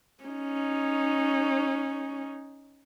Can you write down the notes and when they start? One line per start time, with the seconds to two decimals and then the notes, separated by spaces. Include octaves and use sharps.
0.25 C#4 D#4